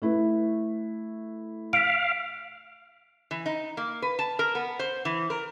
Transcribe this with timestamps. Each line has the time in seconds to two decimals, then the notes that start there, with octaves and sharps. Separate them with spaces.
0.02 A3 E4 B4
1.73 F5 F6 B6 D7
3.31 E3
3.46 D#4
3.77 A#3
4.02 B4
4.19 A5
4.39 A#4
4.55 B3
4.79 C5
5.05 E3
5.30 A#4